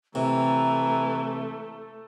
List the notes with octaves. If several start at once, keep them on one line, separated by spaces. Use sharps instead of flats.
C3 E3 A3 A#5